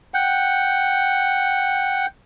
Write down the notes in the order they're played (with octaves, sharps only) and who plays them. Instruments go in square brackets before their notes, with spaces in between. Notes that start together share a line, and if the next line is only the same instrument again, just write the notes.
[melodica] F#5 G5